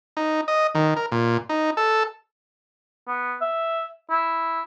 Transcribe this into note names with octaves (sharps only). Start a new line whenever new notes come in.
D#4
D#5
D#3
A#4
A#2
D#4
A4
B3
E5
E4